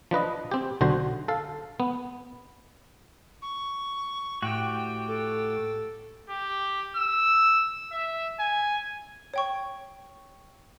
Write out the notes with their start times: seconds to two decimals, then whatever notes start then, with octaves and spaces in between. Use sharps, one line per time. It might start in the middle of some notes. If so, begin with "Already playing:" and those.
0.11 F3 D4 B4 D#5
0.51 C4 G4
0.81 B1 D3 F#4 C5
1.28 A4 F5
1.80 B3
3.42 C#6
4.42 A2 F#4 G4 G5
5.09 A4
6.30 G4
6.97 E6
7.92 E5
8.40 G#5
9.34 C#5 G5 C#6